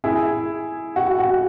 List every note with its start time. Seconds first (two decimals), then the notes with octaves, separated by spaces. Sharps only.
0.04 E4 G#4
0.96 F#4
1.19 F#4